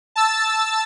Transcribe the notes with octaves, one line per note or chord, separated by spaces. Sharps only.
A5 E6 A6